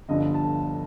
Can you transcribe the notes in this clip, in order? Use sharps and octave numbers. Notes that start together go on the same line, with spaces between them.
G1 G2 D3 F3 D#5
A5